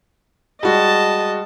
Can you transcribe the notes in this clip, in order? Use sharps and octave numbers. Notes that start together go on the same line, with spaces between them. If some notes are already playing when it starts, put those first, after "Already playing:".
G3 G#3 F#4 D#5 A5